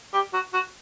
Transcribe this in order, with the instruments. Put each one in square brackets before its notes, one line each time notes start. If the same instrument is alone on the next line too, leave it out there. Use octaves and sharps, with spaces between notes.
[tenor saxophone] G4
F#4
F#4